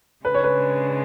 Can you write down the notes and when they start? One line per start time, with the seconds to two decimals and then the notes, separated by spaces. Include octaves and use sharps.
0.25 C#3 G#3 D4 B4
0.34 C#5
0.44 B4